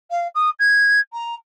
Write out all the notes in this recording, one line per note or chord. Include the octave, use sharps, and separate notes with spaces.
F5
D#6
G#6
A#5